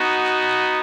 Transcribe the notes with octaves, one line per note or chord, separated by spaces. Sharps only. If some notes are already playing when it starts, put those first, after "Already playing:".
Already playing: B3 D#4 F#4